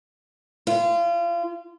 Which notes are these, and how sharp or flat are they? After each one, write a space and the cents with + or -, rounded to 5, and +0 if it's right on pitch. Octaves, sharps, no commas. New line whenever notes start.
F4 -30